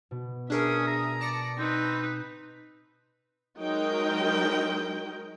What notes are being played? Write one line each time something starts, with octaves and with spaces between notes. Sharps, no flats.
B2
C#4 D4 G#4 A#4 E5 D#6
A#5
D5 A5 A#6 C#7
C4 D#4 B4
F#3 G#3 D#4 A#4 D#5 G5